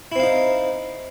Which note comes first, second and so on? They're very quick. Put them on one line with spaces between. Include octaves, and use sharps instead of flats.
E4 C4 F5 D#4